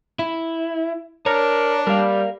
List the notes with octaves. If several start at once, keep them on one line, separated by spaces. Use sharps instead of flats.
E4
D4 A#4 C#5
G3 A#4 F5